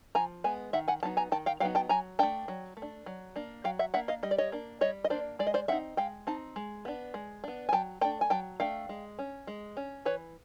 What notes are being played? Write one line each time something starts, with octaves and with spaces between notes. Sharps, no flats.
F3 G#5 A#5
G#3 B3 G#5
D#3 E5 F#5
F#5 G#5
F#3 B3 D#4 A5
G#5 A#5
D#3 G5 A5
F5 G5
F#3 B3 D#4 F5 G5
G5 A5
F#3 G#5 A#5
A3 D4 G5 A5
F#3
A3
D4
F#3
A#3 D4
F#3 F5 G5
E5 F#5
A#3 D4 E5 F#5
D#5 F5
G3 D#5
D5
C#5 D#5
A#3 D4
G3 C#5 D#5
D#5
A#3 D4 C5 D5
G#3 D5
D#5
C5 D5
C4 D#4 E5 F#5
G#3 F5 G5
C4 D#4 A5
G#3
B3 D4
G#3
B3 D4
G#5
F#3 G5 A5
A3 D4 G5 A5
G#5
F#3 G5 A5
A3 D4 F5 G5
G#3
C#4
G#3
C#4
E3 B4 C#5